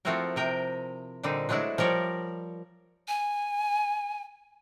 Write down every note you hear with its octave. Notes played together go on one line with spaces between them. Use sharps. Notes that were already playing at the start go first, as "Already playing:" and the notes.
F3 A3 C4 E4 F#4 A#4
C3 A#4 G5
A#2 D3 G3 C4 D#4
F#3 G#3 A3 D4 E4
F3 G3 A#4 C#5 D5
G#5